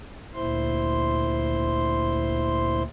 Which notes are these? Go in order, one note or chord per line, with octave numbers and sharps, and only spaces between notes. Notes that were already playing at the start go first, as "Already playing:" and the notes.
D2 A#2 E4 C5 C6